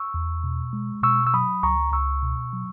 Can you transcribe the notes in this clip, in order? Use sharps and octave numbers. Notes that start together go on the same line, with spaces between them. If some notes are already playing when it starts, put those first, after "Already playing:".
Already playing: C#6 E6
E2
B2
G#3
B2 C#6 E6
E6
F#3 B5 D#6
C#2 A#5 C#6
C#2 C#6 E6
B2
F#3